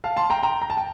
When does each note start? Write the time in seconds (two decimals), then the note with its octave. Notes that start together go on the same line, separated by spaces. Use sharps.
0.04 F5 A5
0.17 A5 C6
0.30 G5 A#5
0.43 G5 A#5
0.62 A#5
0.70 A5
0.77 G5